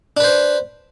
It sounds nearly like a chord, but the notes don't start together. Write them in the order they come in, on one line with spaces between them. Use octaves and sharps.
D4 B4 C5